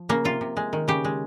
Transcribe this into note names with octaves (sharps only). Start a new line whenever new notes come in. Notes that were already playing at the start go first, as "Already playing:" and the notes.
Already playing: F3
C#3 A#3
C3 F4
C3
G#3
D#3
C#3 G4
G#3